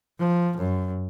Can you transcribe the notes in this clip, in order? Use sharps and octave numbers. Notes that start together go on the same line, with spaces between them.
F3
F#2